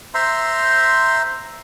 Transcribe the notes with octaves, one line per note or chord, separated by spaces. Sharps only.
C5 E5 A#5 C6